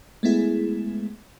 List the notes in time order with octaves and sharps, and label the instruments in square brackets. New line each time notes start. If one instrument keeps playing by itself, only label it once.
[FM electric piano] G#3 A3 B3 E4 G#4